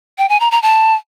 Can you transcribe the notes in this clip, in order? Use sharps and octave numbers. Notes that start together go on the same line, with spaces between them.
G5
G#5
A#5
A#5
A5